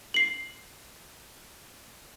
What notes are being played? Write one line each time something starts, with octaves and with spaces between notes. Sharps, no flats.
C7 F#7